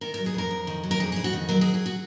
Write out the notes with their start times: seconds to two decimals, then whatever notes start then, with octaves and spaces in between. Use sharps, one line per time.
0.01 D#3 A#4
0.14 A#4
0.18 F#3
0.26 G#4
0.34 F2 A#4
0.51 F2
0.67 D#3
0.84 F#3
0.91 A#4
1.00 F2 G#4
1.12 G#4
1.16 F2
1.24 F#4
1.33 D#3
1.49 F#3 A#4
1.61 G#4
1.66 F2
1.74 G#4
1.86 F#4